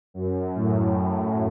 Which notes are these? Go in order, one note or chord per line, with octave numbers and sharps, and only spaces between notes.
F#2
A2